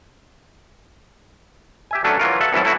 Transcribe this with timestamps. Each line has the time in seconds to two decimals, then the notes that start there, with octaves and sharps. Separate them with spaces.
1.91 G4 E5 G#5
2.04 F#3 A3 C#4 D4 A4 B4
2.19 E3 F#3 F4 A#4
2.41 A4 E5 F#5
2.53 C2 E3 F#3 C#4 E4 A5
2.65 A3 E4 F#4